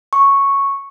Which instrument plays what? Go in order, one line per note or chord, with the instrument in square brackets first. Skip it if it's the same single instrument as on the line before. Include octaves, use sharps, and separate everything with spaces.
[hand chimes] C#6